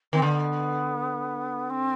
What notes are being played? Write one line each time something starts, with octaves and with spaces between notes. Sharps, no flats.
D#3 C4
D3 B3
C4